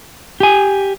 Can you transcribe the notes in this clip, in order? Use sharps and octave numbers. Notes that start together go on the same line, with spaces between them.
G4 G#5